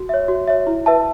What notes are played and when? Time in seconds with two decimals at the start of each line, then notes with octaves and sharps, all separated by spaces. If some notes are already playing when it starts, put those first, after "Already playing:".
Already playing: F#4
0.09 C#5 E5
0.28 F#4
0.47 C#5 E5
0.67 E4
0.86 B4 E5 A5